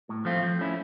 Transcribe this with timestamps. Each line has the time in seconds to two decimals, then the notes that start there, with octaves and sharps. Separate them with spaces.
0.09 A2
0.25 F3 A3 C4 F4
0.42 F3
0.59 A3 C#4 E4